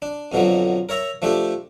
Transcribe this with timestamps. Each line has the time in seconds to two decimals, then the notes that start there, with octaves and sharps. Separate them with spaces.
0.02 D4
0.32 F2 B2 D3 F3 F#3
0.89 A#4 C#5 E5 A#5
1.22 F3 A3 D4 G4 A4